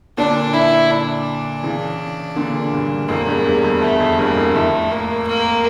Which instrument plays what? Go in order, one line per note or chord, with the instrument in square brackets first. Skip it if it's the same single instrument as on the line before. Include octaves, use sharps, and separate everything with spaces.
[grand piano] A#2 D3 [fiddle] D4
[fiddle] E4
D4
[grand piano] C#3 E3
A#2 D3
G2 A#2
[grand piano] F2 A2 [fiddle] A#3
[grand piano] E2 G2
E2 G2
F2
[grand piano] E2 [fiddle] A3
[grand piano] F2
[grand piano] E2 G2 [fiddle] A#3
[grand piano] F2 A2
[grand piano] F2 A2 [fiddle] A3
[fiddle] A#3
A#3